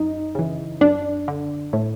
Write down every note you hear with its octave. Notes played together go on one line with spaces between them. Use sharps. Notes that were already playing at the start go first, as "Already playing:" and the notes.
Already playing: F#2 D#4
C#3 E3
F#2 D4
D3
A2